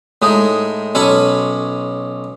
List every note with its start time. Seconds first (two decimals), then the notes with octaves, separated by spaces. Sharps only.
0.22 A2 G#3 D#4 G#4
0.95 B1 C#4 A4 G#5 B5 C#6